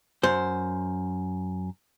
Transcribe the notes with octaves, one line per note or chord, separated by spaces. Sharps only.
F#2 C5